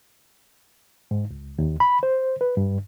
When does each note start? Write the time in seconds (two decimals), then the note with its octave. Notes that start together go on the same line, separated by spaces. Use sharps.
1.11 G#2
1.31 C#2
1.59 D#2
1.80 B5
2.03 C5
2.41 B4
2.57 G2